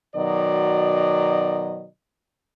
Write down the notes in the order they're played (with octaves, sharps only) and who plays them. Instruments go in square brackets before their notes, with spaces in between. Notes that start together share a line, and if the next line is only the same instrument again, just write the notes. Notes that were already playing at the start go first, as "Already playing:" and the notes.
[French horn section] B2 D#3 F#3 D5 D#5